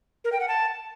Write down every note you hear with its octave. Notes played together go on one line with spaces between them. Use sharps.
A#4
G5
F#5
A5